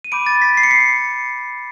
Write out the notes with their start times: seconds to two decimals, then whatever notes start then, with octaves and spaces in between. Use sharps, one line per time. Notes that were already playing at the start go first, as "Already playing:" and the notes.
0.04 D#7
0.12 B5 D6 G6 D7
0.26 A6
0.42 B6
0.57 C7
0.63 C#7
0.71 C7